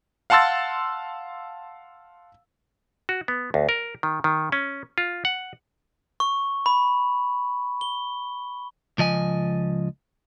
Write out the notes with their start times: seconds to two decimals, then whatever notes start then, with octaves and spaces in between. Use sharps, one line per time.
0.30 F5 F#5 A5 C6 E6 A6
3.09 F#4
3.28 B3
3.54 D2
3.69 A#4
4.03 D#3
4.24 D#3
4.52 C#4
4.98 F4
5.25 F#5
6.20 C#6
6.66 B5
7.81 G7
8.98 C#2 F3 D#5 G#5